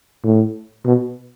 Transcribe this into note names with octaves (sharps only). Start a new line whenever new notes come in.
A2
B2